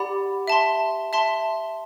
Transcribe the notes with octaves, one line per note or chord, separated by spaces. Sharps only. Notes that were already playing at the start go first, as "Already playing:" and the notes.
Already playing: G4 D5 F#5 B5
E5 A5 C6
E5 A5 C6